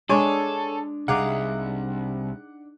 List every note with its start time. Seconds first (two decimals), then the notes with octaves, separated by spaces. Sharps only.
0.09 G#3 D4 A4 C#5 G#5
1.08 C2 D#4 G#4 F5 F#5 D6